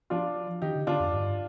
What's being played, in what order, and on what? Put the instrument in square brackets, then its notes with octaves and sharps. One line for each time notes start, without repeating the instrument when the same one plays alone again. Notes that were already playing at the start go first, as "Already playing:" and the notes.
[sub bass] F3 [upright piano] D4 F4
[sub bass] D#3 [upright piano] D#4 G4
[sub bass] D3
[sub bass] D3 [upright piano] D4 F4
[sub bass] F2
G2